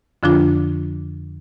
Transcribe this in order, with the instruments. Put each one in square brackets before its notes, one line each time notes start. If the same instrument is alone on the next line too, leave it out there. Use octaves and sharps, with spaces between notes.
[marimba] F2 D3 F3 D4 F4